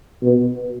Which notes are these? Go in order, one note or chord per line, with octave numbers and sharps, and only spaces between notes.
B2